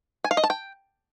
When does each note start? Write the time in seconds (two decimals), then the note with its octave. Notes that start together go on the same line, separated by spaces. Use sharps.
0.24 G#5
0.31 F5
0.37 D#5
0.44 A5
0.50 G5